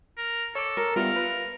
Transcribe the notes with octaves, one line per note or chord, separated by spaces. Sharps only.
A#4
A4 C#5 D6
A#4
G3 B3 F4 A#4 E5
B4